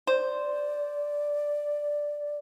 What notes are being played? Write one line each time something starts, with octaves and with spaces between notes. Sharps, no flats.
C5 D5